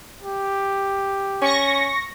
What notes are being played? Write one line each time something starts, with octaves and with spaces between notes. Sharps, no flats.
G4
C#4 C#6 A#6